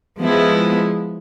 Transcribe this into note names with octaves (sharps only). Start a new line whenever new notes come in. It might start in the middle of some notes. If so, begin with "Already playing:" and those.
F3 G#3 B3 E4